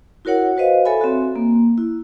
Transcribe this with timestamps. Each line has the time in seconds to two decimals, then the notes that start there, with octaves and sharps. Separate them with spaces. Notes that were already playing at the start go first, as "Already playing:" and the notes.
0.25 E4 F#4 A#4 C#5 F#5
0.57 F#4 B4 C5 D#5 F5
0.85 A4 C#5 E5 G#5 B5
1.01 C4 F#4
1.36 A#3
1.78 E4